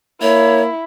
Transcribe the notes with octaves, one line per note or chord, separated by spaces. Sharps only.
A#3 E4 C#5